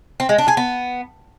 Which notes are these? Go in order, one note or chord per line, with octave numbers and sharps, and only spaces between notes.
C4
G#3
D4
G#4
B3